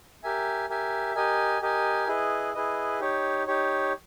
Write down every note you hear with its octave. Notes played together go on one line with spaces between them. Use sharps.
G4 A#4 E5 G#5
G4 A#4 E5 G#5
G4 A#4 D#5 G#5
G4 A#4 D#5 G#5
E4 G#4 B4 D#5
E4 G#4 B4 D#5
D#4 G4 C#5
D#4 G4 C#5